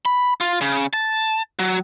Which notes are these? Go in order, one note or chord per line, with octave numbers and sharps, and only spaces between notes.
B5
F4
C#3
A5
F#3